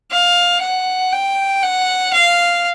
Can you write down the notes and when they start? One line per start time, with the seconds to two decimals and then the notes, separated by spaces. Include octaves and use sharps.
0.11 F5
0.61 F#5
1.12 G5
1.63 F#5
2.13 F5